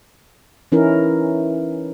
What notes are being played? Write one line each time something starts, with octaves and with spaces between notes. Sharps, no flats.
E3 C#4 D#4 E4 A#4